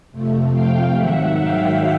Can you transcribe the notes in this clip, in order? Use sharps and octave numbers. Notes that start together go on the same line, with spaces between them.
F2 C3 F3 A3
F5 G5
G#2 D#3 F#3 E5 F#5
F5 G5